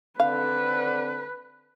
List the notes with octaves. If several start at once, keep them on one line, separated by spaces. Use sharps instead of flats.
D3 C4 B4 F5